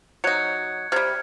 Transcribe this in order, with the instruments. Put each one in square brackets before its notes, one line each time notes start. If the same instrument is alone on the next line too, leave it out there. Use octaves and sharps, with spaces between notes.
[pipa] F#3 D#4 [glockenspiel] F#6 G#6 C#7
[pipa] C3 G3 [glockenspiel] F6 G#6